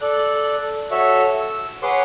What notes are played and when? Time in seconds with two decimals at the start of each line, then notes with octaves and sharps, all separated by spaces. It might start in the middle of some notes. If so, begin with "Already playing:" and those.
0.01 A4 D5 F#6
0.91 F#4 A4 C#5 E5
1.40 E6
1.83 G#4 B4 C#5 F#5 C6 D6